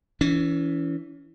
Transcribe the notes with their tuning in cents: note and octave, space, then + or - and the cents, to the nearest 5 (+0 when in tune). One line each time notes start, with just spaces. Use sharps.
E3 +0 C#4 +30